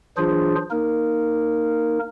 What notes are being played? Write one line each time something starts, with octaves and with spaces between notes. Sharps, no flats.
E3 F#3 D4 F4 G#4 C5
A#3 D#4 A#4